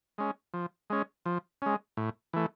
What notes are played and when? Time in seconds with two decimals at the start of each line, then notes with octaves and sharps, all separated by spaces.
0.18 G#3 C#4
0.54 F3
0.90 G#3 C#4
1.26 F3
1.62 G#3 C#4
1.97 A2
2.33 E3 A3